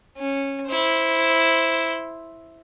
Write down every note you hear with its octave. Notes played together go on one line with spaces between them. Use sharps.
C#4
E4 C5